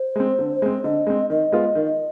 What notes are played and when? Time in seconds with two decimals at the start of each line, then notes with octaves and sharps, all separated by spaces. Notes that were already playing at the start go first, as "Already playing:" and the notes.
Already playing: C5
0.16 G#3 C4
0.39 D3
0.62 G#3 C4
0.84 D3 D#5
1.07 G#3 C4
1.30 D#3 D#5
1.52 G#3 B3 F4
1.75 D#3